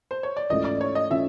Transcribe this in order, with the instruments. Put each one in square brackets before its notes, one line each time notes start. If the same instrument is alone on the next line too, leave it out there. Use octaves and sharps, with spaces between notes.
[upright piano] C5
C#5
D5
[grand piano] G#2 E3 A3 C#4 F4 [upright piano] D#5
[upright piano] D5
C#5
D#5
[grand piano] E3 A3 C#4 F4 [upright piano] E5